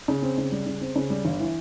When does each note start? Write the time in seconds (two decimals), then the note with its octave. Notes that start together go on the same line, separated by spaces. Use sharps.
0.08 C#3
0.22 C4
0.38 C#3
0.52 G3
0.66 C#3
0.81 C4
0.96 C#3
1.10 G3
1.25 G1
1.40 E3